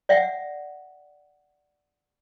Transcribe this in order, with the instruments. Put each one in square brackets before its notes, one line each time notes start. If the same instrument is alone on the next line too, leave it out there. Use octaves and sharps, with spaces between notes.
[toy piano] D5 E5 F#5 G5